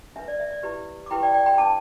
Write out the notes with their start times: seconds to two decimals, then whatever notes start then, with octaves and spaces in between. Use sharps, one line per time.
0.16 D4 B4 E5
0.28 D5
0.40 E5
0.52 D5
0.63 E4 G4 B4
1.06 D6
1.10 E4 G4 B4 G5 B5
1.23 D5 G5
1.34 D5 G5
1.46 G5 B5
1.58 D4 B4 A5 D6